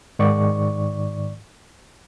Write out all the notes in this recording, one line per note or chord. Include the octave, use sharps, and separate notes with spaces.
G#2 D#3 D5 C#6